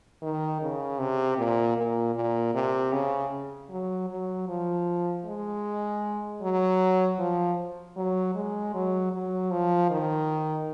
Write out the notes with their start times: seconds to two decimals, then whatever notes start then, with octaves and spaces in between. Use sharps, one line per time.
0.22 D#3
0.61 C#3
0.99 C3
1.38 A#2
1.77 A#2
2.15 A#2
2.54 C3
2.92 C#3
3.70 F#3
4.09 F#3
4.48 F3
5.25 G#3
6.42 F#3
7.19 F3
7.96 F#3
8.35 G#3
8.74 F#3
9.13 F#3
9.51 F3
9.90 D#3